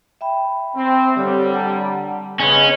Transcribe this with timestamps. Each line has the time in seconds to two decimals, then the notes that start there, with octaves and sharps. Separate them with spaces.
0.21 E5 G5 B5
0.76 C4
1.16 D3 G3 G4 C#5
1.54 F#5 A5 A#5
2.40 C#3 G#3 B3 C#4 D#5